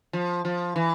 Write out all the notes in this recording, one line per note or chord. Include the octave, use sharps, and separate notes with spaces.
F3
F3
E3